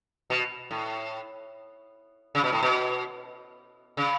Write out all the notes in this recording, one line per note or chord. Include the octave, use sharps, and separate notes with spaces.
B2
A2
C#3
B2
A2
B2
C#3